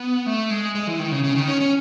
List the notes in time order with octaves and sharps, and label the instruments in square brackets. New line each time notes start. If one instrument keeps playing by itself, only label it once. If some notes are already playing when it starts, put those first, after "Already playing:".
Already playing: [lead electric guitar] B3
A3
G#3
G#3
E3
D#3
C#3
C#3
D#3
C#4
C#4